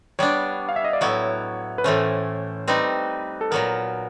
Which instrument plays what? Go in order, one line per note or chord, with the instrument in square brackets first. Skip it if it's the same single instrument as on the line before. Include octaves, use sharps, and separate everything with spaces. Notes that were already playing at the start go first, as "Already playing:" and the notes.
[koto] G3 B3 D4 [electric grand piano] C#5
[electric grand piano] F5
E5
D#5
D5
[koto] A2 F#3 B3 E4 [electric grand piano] C#5
[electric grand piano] B4
[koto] A2 E3 A3 C#4 [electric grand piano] C5
[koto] G3 C4 D#4 [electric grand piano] B4
[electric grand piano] A4
[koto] A#2 F#3 B3 [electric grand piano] A#4